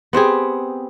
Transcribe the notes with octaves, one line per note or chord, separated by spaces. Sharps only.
B3 C4 G4 G#4